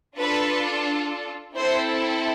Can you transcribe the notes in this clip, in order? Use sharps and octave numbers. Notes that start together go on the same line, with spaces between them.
D4 F4 A4 B4
C4 E4 A4 C5